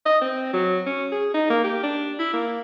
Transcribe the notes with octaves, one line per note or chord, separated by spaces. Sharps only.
D#5
C4
F#3
C#4
G#4
D#4
A#3
G4
D4
E4
A#3